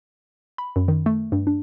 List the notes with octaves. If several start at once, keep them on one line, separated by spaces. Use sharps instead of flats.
B5
F#2
D#3
A3
G2
D4